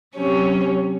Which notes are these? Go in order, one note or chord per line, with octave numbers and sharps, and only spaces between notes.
C3 F#3 C#4